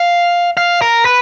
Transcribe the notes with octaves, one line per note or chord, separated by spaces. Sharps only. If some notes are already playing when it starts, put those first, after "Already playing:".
Already playing: F5
F5
A#4
B4